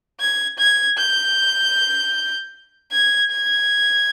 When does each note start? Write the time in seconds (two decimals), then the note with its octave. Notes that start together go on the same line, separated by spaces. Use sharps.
0.20 G#6
0.58 G#6
0.98 G6
2.92 G#6
3.31 G#6